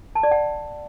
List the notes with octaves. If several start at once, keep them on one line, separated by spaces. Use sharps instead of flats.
A5
D5
F#5